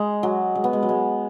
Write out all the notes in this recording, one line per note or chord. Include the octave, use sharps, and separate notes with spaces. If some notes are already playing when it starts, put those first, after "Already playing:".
Already playing: G#3
F#3
G#3
B3
G#3
F#3
G#3